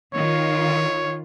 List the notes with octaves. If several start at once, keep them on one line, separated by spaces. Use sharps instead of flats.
D#3 F4 C#5